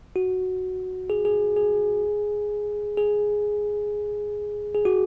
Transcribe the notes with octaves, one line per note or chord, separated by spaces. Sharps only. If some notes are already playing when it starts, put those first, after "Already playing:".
F#4
G#4
G#4
G#4
G#4
G#4
F#4